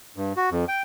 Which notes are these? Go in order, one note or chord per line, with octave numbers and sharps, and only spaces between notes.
G2
F#4
F2
G5